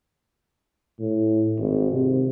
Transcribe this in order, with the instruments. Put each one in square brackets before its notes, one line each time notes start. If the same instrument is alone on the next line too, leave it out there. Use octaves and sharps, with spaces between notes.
[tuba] A2
G#1
C3